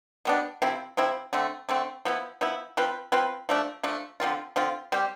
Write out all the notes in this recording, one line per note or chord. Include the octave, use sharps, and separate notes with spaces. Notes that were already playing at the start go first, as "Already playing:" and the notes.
B2 G3 B3 D4
C3 F3 C4 E4
C3 F3 C4 E4
D3 A3 C4
D3 A3 C4
F3 B3 E4
F3 B3 E4
F3 C4 F4 B4
F3 C4 F4 B4
F3 A3 D4
F3 A3 D4
D3 F3 C4 F4
D3 F3 C4 F4
G3 C4 G4